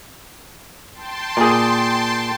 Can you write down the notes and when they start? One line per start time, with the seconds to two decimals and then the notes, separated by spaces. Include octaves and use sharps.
0.94 G5 A5 C6
1.37 A#2 G#4